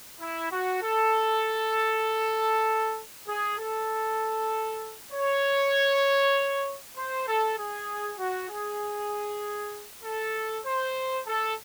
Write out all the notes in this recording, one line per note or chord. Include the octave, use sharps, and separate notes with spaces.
E4
F#4
A4
G#4
A4
C#5
C5
A4
G#4
F#4
G#4
A4
C5
A4